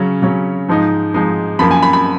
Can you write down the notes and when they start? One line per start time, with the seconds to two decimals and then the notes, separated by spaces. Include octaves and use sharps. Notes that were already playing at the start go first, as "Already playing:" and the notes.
Already playing: C#3 F#3 C#4
0.22 C#3 F#3 C#4
0.69 G#2 F3 G#3 D#4
1.14 G#2 F3 G#3 D#4
1.59 F#2 F3 A#3 B5
1.71 G#5
1.83 B5
1.93 B5